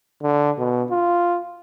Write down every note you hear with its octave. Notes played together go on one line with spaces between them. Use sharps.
D3
B2
F4